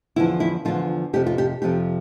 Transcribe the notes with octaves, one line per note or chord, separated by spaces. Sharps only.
E2 D3 F3 E4
E4
E2 D3 F3 F4
F2 C3 F3 G4
F4
G4
F2 C3 F3 G4